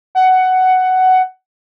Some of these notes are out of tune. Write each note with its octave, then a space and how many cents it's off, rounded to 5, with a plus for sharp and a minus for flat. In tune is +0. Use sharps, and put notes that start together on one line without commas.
F#5 +10